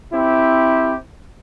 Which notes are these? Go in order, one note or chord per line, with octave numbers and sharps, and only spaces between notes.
C4 E4 G4